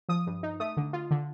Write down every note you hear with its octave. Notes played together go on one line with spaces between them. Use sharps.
F3 D#6
G2
D#4
A3 D#6
D3
F4
D3